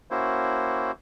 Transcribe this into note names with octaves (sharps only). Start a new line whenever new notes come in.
A#3 C#4 E4 F#4 C5